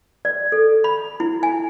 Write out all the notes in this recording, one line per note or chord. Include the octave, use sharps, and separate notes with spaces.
D5
A4
B5
E4
G#5